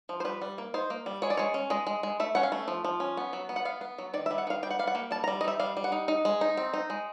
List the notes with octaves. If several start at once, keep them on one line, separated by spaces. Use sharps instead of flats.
F3
C5
G3 B4
G3
A#3
D#4 C5
A#3
G3
G#3 C#5
D5
G#3 C#5
C#4
G#3 D#5
G#3
G#3
A3 E5
C#4 F#5
F5
A3
F3
F3
C#4
B3
F#3
B3
F#5
B3 F5
B3
F#3
D#3 D5
E5
G3
F#5
D#3 F5
G3 G5
F#5
G3 F5
F#5
A#3
G3 A5
A#5
G3
D#5
D#4 E5
G3 F5
G3
F#5
D#4
D#4
G#3
D#4
C4
D#4
G#3